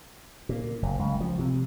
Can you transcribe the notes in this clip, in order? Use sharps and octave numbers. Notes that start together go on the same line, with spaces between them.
A#2
F#1
C#2
F3
C3